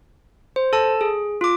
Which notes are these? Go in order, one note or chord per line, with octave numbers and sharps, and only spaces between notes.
C5
A4 A5
G#4
F4 D6